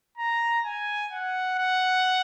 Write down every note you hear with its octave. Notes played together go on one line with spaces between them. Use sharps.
A#5
G#5
F#5
F#5